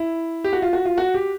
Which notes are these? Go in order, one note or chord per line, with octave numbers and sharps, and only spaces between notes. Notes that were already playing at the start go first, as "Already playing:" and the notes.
Already playing: E4
G4
F#4
F4
F#4
F4
F#4
G4